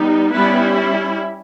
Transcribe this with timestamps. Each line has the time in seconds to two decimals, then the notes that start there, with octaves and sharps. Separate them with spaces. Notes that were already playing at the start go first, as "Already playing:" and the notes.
Already playing: G3 B3 D#4
0.32 G3 B3 C#4 E4 B4